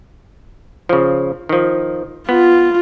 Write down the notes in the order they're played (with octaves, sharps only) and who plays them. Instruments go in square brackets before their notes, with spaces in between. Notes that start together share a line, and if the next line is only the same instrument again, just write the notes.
[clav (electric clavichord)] C#3 F3
D#3 F3
[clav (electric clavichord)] B3 [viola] F4